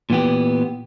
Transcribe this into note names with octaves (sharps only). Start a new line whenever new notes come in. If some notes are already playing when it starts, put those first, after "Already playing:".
A#2 E3 B3 G4